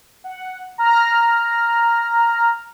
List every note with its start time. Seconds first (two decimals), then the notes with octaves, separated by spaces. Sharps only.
0.24 F#5
0.78 A#5 F6